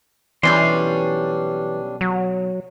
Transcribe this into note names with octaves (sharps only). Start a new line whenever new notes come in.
B1 E3 G3 C#4 D4 C6
F#3